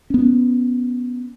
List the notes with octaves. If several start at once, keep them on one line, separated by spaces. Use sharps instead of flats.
B3 C#4